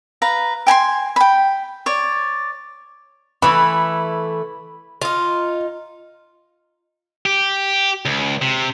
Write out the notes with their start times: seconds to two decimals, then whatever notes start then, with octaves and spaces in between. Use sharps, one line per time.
0.22 B4 F5 A#5
0.67 G5 G#5 B5 C6
1.16 G5 B5
1.86 C#5 D5
3.42 E3 A3 B5
5.02 D#4 F4
7.26 G4
8.05 C#2
8.42 C3